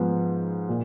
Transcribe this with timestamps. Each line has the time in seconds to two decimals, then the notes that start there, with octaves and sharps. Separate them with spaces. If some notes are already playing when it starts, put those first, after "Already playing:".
Already playing: G#2 F3 B3
0.69 A#2